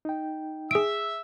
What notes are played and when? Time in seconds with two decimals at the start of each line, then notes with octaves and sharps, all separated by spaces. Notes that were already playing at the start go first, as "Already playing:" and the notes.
0.05 D#4 G5
0.71 G#4 E5 E6 D7